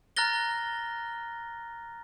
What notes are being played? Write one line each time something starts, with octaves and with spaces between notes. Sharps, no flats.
A#5 F6 F#6 A6 A#6 G7